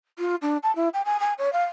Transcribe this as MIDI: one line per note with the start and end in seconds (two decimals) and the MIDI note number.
0.19 0.35 65
0.42 0.57 62
0.63 0.73 81
0.75 0.89 64
0.93 1.02 79
1.05 1.20 80
1.20 1.33 80
1.38 1.52 73
1.53 1.64 77